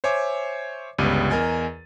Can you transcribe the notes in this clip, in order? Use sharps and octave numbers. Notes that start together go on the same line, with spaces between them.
C5 C#5 E5 G#5 D6
G1 C#2 G3 B3 D5 D#7
E2 A#4 D#5 G#5 A6